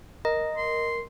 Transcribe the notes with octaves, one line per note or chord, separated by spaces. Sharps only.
A#4 D#5
C6